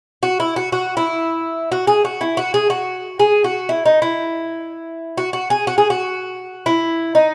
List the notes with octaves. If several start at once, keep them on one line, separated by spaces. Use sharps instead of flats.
F#4
E4
F#4
F#4
E4
F#4
G#4
F#4
E4
F#4
G#4
F#4
G#4
F#4
E4
D#4
E4
F#4
F#4
G#4
F#4
G#4
F#4
E4
D#4